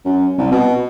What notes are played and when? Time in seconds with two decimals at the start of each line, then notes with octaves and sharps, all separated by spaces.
0.05 F#2
0.38 C2
0.52 B2